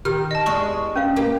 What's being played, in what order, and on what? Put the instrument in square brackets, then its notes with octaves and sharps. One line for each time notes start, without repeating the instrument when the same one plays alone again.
[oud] D#3 [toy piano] G4 [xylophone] F6
[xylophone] D#5 A5
[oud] E2 G#3 D4 [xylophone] C#6
[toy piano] C#4 B4 F5
[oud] A#3 G4